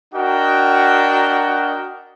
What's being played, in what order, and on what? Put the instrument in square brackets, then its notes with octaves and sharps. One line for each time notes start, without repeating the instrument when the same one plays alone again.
[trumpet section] D4 F#4 A#4 D#5 F#5 G5